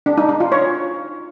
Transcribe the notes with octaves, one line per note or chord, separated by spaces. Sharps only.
D4
D#4
D#4
F4
C#5